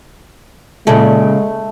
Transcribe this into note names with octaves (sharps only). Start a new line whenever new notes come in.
A#2 C#3 G#3 A3